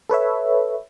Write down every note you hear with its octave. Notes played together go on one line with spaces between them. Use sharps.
A4 B4 C#5 E5